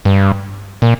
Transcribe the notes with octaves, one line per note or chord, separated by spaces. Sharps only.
G2
A#2